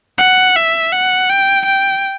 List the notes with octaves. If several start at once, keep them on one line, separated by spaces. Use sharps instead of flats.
F#5
E5
F#5
G5
G5